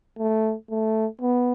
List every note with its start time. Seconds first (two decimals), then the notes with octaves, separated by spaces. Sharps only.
0.18 A3
0.70 A3
1.21 B3